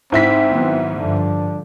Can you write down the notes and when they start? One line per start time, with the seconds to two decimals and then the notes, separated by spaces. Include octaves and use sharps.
0.12 G#2 C4 E4 B6
0.49 D#3 F#3 B3
0.98 G2 D3 F3 D4